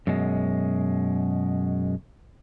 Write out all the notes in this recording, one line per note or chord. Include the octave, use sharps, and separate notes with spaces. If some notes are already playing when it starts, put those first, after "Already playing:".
F#2 B2 G#3